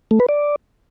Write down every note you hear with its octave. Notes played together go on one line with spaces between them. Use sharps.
A3
B4
D5